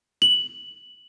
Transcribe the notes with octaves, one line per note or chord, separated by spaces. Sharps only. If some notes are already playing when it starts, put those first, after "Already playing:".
F#7